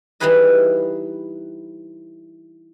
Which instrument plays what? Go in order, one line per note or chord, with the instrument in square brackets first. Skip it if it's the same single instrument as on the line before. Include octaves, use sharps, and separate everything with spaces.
[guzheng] E3 G3 D#4 G#4 B4 D#5